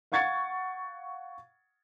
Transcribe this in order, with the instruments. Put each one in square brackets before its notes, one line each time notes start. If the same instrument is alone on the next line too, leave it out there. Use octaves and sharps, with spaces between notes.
[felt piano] F5 F#5 C#6 G#6 A6 C#7